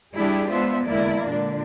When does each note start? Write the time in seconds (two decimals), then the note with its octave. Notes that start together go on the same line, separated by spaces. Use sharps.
0.16 G3 D4 E4 G4 G#4
0.51 G#3 B3 D4 F4 C5 E5
0.87 E2 D3 G#3 A#3 E4 D5
1.28 A#2 D3 D4